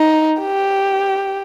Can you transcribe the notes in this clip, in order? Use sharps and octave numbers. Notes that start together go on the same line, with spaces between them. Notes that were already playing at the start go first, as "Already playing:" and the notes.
Already playing: D#4
G4